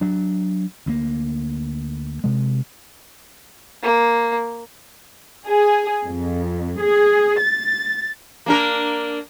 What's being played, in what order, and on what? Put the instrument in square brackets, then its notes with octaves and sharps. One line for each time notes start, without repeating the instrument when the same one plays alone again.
[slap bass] F#3 D4
D2 A3 A#3
C3 G#3
[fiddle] A#3
[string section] G#4
F2
G#4
A6
[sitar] A#3 D4 A#4